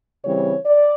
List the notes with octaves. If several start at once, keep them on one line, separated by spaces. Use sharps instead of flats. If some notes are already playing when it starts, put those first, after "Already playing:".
C#3 E3 G3 C4 C#5
D5